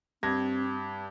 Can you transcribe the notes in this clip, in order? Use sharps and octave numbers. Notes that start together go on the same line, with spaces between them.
G2 C4 G#6 A#6